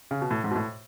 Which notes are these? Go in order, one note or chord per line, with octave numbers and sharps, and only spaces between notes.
C#3
B2
A2
G#2
B2
A2